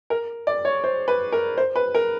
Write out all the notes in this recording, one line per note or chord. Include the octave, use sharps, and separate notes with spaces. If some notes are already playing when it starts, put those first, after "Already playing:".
A#4
D5
C#5
C5
B4
A#4
C5
B4
A#4